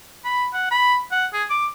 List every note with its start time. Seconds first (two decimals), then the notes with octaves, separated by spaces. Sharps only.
0.25 B5
0.54 F#5
0.71 B5
1.11 F#5
1.34 G#4
1.50 D6